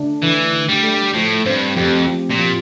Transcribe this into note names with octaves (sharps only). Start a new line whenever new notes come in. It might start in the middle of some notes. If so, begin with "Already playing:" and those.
Already playing: D3 A3 D4
D3 E3
D3
G3
A3
A2 F3
G2 C4
F2 G4
F3
A#2
F3